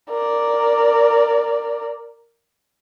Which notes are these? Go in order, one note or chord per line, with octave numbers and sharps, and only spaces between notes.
A#4 D5